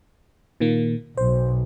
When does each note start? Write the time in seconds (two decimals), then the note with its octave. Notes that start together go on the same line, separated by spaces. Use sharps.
0.60 A#2 D#3 A#3
1.17 B1 C5